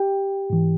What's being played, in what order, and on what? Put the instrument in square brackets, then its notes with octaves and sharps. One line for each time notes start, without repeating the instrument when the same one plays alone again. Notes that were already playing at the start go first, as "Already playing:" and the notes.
Already playing: [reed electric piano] G4 G5
G#2 E3